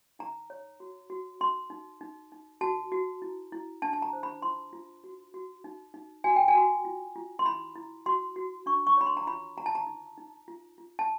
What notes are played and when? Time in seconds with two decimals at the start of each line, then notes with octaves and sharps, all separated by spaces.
0.19 D#4 A#5
0.50 C#5
0.80 F#4
1.10 F#4
1.41 D#4 C6
1.70 D#4
2.01 D#4
2.32 D#4
2.61 F#4 A5
2.92 F#4
3.22 E4
3.52 E4
3.82 D4 A5
3.93 A5
4.02 A#5
4.13 C5
4.23 B5
4.42 F4 C6
4.73 F4
5.04 F#4
5.34 F#4
5.64 D#4
5.94 D#4
6.24 F#4 G#5
6.36 G5
6.48 G#5
6.55 F#4
6.85 F4
7.16 F4
7.39 C6
7.45 E4 B5
7.75 E4
8.06 F#4 C6
8.36 F#4
8.66 D4 C#6
8.87 C#6
8.97 C#5 B5
9.06 C6
9.17 A#5
9.27 F4 B5
9.57 F4 A#5
9.66 A5
9.75 A#5
9.87 D#4
10.18 D#4
10.48 F4
10.78 F4
10.99 A5